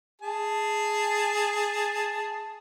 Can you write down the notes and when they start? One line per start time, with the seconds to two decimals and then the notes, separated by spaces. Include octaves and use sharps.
0.22 G#4 A5